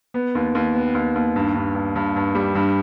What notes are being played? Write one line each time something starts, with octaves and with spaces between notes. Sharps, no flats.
B3
D#2
D#2
B3
D#2
D#2
G2
G2
G2
G2
G2
G3
G2